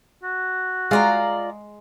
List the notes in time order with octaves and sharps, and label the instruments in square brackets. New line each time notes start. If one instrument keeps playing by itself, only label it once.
[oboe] F#4
[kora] G#3 [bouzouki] F4 D5 A#5